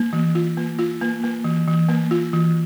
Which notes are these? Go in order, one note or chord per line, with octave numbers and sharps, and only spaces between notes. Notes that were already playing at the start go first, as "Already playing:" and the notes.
Already playing: A#3
E3
F4
A#3
F4
A#3
A#3
E3
E3
A#3
F4
E3